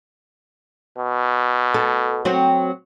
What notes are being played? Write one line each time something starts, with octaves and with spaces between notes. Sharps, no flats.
B2
A4
F#3 C4 F#4